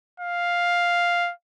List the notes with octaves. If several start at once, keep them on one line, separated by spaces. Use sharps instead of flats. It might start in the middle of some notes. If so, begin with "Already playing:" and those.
F5